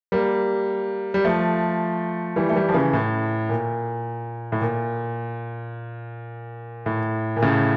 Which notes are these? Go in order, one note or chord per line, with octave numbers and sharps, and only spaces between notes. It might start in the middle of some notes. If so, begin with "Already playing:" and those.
G3 A#3
G3
F3 A3
E3 G3
A3
E3 G3
F3
C#3 E3
A2
A#2
A2
A#2
A2
A#2
A2 C#3